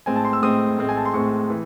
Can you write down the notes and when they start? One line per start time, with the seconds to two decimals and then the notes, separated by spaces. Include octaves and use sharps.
0.06 A2 G#3 C4 G#5
0.16 A5
0.25 C6
0.33 E6
0.42 A2 G#3 C4 D#6
0.78 A2 G#3 C4
0.89 G#5
0.97 A5
1.05 C6
1.14 A2 G#3 C4 C#6
1.50 E3